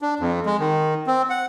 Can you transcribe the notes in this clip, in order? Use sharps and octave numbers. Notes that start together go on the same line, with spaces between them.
D4
F2
G#3
D#3
C4
F#5